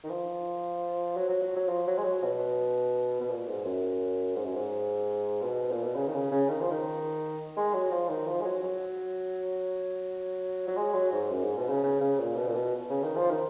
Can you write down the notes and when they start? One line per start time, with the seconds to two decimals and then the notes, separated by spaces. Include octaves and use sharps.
0.04 D#3
0.10 F3
1.16 F#3
1.29 F#3
1.42 F#3
1.56 F#3
1.69 F3
1.87 F#3
1.98 G#3
2.04 F#3
2.23 B2
3.21 B2
3.30 A#2
3.47 G#2
3.65 F#2
4.36 G#2
4.45 F#2
4.55 G#2
5.42 B2
5.71 A#2
5.84 B2
5.95 C#3
6.08 D#3
6.14 C#3
6.31 C#3
6.49 D#3
6.61 F3
6.71 D#3
7.57 G#3
7.74 F#3
7.91 F3
8.09 D#3
8.27 F3
8.41 G#3
8.44 F#3
8.63 F#3
10.68 F#3
10.77 G#3
10.94 F#3
11.12 G#2
11.30 F#2
11.43 G#2
11.57 B2
11.69 C#3
11.84 C#3
12.01 C#3
12.19 A#2
12.36 B2
12.47 A#2
12.55 B2
12.90 C#3
13.03 D#3
13.16 F3
13.30 D#3